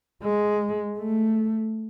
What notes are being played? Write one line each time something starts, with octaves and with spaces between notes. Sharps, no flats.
G#3
A3